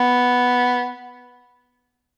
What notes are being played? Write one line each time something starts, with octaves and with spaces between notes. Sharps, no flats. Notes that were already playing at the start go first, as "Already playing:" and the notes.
Already playing: B3